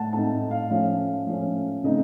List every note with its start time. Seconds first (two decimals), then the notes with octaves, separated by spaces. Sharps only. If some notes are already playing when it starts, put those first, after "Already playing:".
Already playing: A2 A3 F#5 A5
0.13 A2 A3 C4 D#4 A5
0.51 F5
0.70 F3 A3 C#4 F5
1.27 F3 A3 C#4
1.84 C#3 A3 C4 D#4 D#5